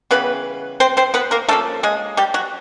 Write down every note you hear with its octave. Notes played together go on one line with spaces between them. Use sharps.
C#3 E3 G3 B3 B4
C4 C5
C4 C5
B3 B4
A#3 A#4
F3 A3 A#3 C#4 A4
G#3 G#4
G3 G4
F#3 F#4